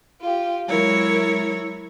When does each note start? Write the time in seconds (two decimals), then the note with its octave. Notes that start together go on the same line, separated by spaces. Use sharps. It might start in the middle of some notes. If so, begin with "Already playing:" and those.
0.21 F4 G4
0.68 F#3 G#3 E4 A#4 C#5